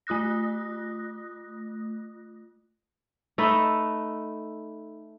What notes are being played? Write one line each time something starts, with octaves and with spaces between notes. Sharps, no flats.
A3 F4 D#6 F#6 A#6
A3 D#4 A4 B4